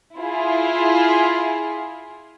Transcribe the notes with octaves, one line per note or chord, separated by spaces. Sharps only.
E4 F4 G#4